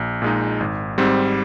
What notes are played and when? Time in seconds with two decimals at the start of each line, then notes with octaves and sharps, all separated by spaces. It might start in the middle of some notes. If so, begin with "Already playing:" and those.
Already playing: A#1
0.22 A#2 G#3 D#4
0.60 G#1
0.98 G#2 G3 C4